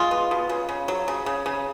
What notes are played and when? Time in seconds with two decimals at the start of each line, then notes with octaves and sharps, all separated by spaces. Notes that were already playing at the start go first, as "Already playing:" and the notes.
Already playing: G#3 F4
0.11 B3
0.31 B2
0.49 C#3
0.69 C#3
0.88 F#3
1.08 C#3
1.26 C#3
1.46 C#3